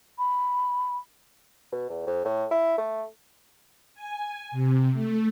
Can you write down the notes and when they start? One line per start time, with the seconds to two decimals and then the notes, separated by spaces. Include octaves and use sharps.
0.19 B5
1.72 B2
1.89 E2
2.06 F2
2.25 A2
2.51 E4
2.78 A3
3.95 G#5
4.51 C3
4.93 A3